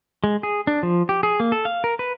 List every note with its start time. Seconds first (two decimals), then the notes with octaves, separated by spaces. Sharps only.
0.24 G#3
0.43 G#4
0.67 D4
0.83 F3
1.09 G4
1.23 G#4
1.40 A#3
1.52 A4
1.65 F5
1.84 A#4
1.99 B4